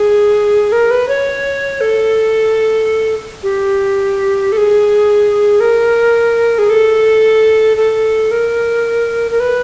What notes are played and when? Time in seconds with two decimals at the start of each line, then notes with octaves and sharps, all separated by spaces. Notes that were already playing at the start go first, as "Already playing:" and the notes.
Already playing: G#4
0.72 A#4
0.91 B4
1.08 C#5
1.81 A4
3.43 G4
4.52 A4
4.57 G#4
5.60 A#4
6.58 G#4
6.69 A4
7.77 A4
8.31 A#4
9.31 A#4
9.40 B4